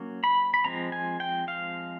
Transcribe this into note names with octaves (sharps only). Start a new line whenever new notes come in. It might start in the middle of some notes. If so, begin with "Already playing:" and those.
Already playing: F#3 A#3 C#4
B5
B5
F3 G#3 C4 A#5
G#5
G5
F5